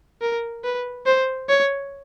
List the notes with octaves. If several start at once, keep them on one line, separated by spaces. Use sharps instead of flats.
A#4
B4
C5
C#5